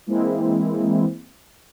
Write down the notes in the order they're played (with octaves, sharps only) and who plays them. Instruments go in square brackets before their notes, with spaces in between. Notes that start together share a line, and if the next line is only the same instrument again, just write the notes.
[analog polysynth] E3 G#3 A#3 C4 E4